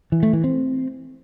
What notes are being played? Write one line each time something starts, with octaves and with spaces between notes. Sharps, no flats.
E3
A3
E3
C4